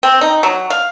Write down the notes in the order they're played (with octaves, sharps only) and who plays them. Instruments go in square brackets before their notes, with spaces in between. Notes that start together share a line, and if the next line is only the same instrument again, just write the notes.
[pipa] C4
D#4
F#3
F5